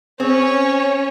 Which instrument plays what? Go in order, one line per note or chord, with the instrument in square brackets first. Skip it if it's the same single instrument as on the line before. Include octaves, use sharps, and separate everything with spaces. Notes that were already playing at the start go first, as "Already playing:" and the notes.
[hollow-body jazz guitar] C4 G#4 [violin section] C#4 C#5